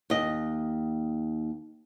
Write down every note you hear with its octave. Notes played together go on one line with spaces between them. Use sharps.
D#2 D#5